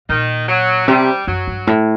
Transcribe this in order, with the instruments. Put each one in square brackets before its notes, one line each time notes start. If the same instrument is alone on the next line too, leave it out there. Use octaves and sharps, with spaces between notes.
[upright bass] A#2 [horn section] D#3
[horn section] F#3
[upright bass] C3 [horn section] G3
[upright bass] F#2 [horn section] F#3
[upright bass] G2
A2